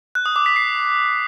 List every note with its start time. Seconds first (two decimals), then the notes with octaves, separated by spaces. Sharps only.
0.15 F#6
0.26 D#6
0.36 D6
0.46 B6
0.56 C7